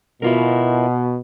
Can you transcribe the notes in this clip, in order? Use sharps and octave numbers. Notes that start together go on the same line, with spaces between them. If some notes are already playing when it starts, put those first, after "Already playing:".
B2 E4 F4 A#4